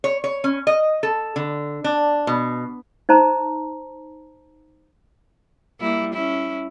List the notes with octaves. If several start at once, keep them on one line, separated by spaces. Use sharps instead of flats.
C#5
C#5
C#4
D#5
A4
D3
D4
B2
D#4 C5 A5 A#5
G3 A#3 E4
C#4 E4